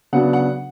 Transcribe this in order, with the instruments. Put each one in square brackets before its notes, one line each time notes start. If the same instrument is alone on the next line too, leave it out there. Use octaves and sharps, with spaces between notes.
[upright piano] C#3 F#3 B3 D4 F#5
F#5